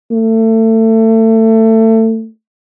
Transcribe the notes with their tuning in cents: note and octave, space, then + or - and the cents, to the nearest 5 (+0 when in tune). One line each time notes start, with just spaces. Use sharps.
A3 +25